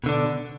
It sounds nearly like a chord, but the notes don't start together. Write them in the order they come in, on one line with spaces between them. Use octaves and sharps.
B2 D3 D4